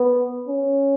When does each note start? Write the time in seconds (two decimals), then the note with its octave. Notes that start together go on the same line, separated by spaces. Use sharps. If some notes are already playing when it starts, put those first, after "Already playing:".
Already playing: B3
0.48 C#4